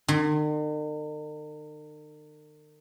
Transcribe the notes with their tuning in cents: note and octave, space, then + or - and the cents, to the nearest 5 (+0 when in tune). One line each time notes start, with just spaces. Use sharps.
D#3 -45